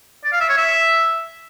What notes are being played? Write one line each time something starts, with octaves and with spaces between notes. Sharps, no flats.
D5
F5
E5
C#5
E5